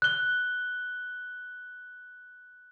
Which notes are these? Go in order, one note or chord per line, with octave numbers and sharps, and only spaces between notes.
F#6 G7